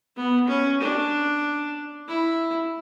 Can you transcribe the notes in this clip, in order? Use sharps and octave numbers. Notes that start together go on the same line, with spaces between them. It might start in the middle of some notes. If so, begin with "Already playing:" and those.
B3
C#4
D4
E4